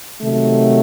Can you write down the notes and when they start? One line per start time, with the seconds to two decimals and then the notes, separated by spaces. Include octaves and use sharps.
0.22 C3 D#3 F#3 A3